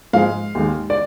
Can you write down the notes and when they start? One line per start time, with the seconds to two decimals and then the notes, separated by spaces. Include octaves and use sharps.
0.13 G#2 F3 G#3 F5
0.55 D#2 D#3 G#3
0.90 D5